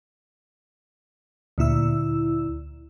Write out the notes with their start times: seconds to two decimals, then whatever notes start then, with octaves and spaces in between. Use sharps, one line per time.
1.58 D2 A#2 E4 E6